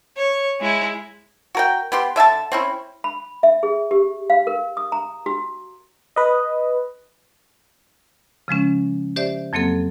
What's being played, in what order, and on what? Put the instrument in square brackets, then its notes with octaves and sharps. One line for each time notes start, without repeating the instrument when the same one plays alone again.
[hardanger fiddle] C#5
G#3 E4
[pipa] F#4 A#4 G5
B3 G4 C6
D3 E5 G#5 A5
C4 C#4 E4
[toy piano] B5
E5
G#4
G4
F5
A#4
D#6
A#5
F#4
[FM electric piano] B4 D#5
[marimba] C#3 F3 G#3 C#4
G4 C5 D5 E5
F2 F#3 A#3 C4 A4